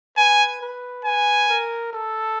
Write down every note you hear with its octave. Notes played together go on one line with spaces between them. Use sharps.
B4 G#5
B4
B4 G#5
A#4
A4